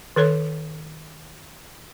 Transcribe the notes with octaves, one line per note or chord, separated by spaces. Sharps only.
D#3 A4 C#5 C6